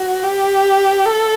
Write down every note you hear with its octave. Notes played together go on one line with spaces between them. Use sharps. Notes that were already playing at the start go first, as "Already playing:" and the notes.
Already playing: F#4
G4
A4